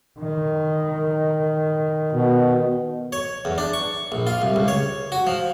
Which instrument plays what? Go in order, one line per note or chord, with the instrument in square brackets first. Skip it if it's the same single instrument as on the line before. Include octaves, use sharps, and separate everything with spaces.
[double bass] D#3
[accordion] B2
[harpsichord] C#5
E2
D4
C#6
A#1
F4
C2
C#2
C#5
F#4
F3